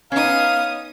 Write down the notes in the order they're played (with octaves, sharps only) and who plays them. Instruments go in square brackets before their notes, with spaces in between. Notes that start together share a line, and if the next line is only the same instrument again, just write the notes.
[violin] B3 D#6 [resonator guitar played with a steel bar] C#4 D#4 [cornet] F5